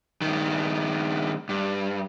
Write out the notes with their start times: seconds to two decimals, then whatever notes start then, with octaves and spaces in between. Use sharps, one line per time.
0.21 G2 D#3
1.49 G2